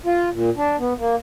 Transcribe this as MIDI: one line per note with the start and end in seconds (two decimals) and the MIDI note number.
0.06 0.29 65
0.33 0.50 46
0.57 0.76 62
0.79 0.93 59
0.98 1.16 58